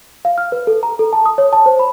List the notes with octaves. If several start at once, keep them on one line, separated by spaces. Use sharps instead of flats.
F5
F6
B4
A4
A#5
A4
A5
D#6
C#5
A5
C5
B5